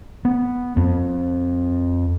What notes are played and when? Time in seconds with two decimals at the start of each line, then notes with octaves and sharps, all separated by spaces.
0.25 B3
0.76 F2